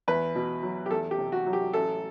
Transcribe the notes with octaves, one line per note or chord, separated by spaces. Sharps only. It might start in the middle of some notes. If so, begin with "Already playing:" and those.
E2 B4
B2
F#3
G4
E2 A4
G4
C3
F#4
F#3
G4
A1 A4